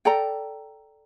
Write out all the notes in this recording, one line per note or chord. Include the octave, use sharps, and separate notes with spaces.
A4 D5 G5 A#5